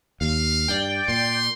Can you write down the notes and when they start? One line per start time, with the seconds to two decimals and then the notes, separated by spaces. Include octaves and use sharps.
0.21 D#2 F5
0.68 G2 D5 G5
1.08 A#2 C6